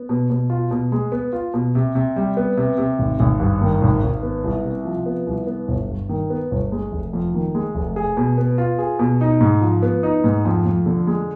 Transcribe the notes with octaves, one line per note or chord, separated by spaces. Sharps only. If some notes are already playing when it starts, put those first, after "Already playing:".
Already playing: B3
B2
B2
F4
B2
G#3
B3
F4
B2
C3
C3
G3
B3
C3
C3
G#1
G#1
G2
D#3
G#1
G#1
B3
C2
C3
F3
B3
C2
B3
G1
G2
D#3
B3
G1
G#3
F1
F2
D#3
G#3
F1
G#4
B2
B3
F4
G#4
B2
D#4
G#2
F3
B3
D#4
G#2
F2
F2
D3
G#3